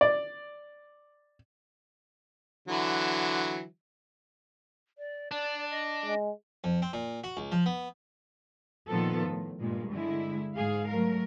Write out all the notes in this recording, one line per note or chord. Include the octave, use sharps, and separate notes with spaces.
D5
D3 E3 F#3
D5
D4 D5
D#5
G#3
F2
C4
A#2
F#4
C#2
F3
B3
A#2 D#3 F3 B3 F4 A4
A2
G2 A#2 G#3
D3 G#3 E4
G#2 G#4 F5
F#3 A3 A#4